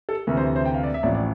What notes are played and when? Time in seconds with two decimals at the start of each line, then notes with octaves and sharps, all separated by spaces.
0.09 A4
0.27 D2 C3 E3 A#4
0.37 C5
0.56 C5
0.65 G5
0.74 F5
0.83 D5
0.94 E5
1.03 A1 A2 F3 D5
1.15 D5